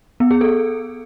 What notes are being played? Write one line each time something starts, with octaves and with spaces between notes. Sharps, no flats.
B3
G#4
A4